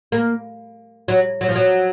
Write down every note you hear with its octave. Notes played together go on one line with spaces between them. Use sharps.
A#3
F#3
F#3
F3
F#3